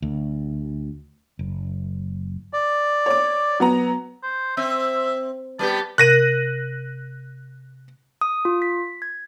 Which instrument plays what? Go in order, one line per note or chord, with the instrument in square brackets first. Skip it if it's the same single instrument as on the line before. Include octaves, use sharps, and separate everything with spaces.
[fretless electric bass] D2
F#1
[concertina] D5
[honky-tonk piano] C#5 D6
F#3 B3 A#5
[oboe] C5
[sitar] C4 [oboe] E5
[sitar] G3 B3 G4 [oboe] A5
[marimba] C3 A#4 [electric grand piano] F#6 A#6 D#7
[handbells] D#6
F4
B6
G#6